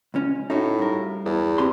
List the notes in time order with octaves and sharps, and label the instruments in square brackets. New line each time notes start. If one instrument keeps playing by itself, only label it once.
[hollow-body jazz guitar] C#2 C#4
[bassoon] A2 [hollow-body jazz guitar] D#4 F#4
[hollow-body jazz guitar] G2 A#4
[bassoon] E2
[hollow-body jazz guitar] C4 G4 C6